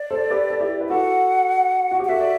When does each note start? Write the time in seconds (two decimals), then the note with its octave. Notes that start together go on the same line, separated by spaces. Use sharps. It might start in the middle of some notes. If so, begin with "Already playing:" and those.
Already playing: D5
0.10 A4 C5
0.31 G4 B4
0.50 A4
0.60 E4 G4
0.81 B4
0.90 F#4 A4 F#5
1.91 F#4
2.00 G4
2.05 F#5
2.09 F#4 A4 E5
2.20 D5